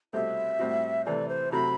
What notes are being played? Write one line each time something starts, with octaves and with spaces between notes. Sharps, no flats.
C2 B2 A3 C4 G4 E5
A2 G3 C4 F#4
C3 E3 A3 D5
C5
C3 F#3 A3 C4 F#4 B5